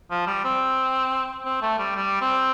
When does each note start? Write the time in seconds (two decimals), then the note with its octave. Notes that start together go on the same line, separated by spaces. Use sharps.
0.11 F3
0.27 G3
0.45 C4
1.45 C4
1.62 A3
1.79 G3
1.96 G3
2.21 C4